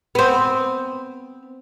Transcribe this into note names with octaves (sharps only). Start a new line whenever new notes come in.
B3 C4